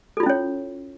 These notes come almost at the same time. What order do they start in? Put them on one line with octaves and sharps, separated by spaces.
A4 F4 E4 C#4 C#5